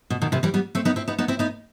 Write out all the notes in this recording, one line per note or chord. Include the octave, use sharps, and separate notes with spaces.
B2
B2 D#3
C3 E3
E3 G3
G3 B3
A3 C4
B3 D#4
C4 E4
B3 D#4
B3 D#4
C4 E4
B3 D#4